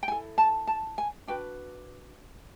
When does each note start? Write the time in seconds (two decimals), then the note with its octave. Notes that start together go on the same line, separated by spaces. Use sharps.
0.03 G5
0.08 E4 A4 G#5
0.38 A5
0.67 A5
0.98 G#5
1.27 D4 F#4 B4 G5